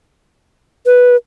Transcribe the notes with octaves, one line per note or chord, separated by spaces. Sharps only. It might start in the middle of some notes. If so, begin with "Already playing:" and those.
B4